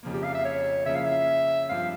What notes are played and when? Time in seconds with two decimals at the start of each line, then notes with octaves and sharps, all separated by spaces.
0.03 F2 C#3 F3 A#3
0.13 G4
0.24 F5
0.34 E5
0.45 C#5
0.86 C#3 F3 A#3 C#4 E4 E5
0.96 F5
1.05 E5
1.69 G2 F3 C4 F4 F5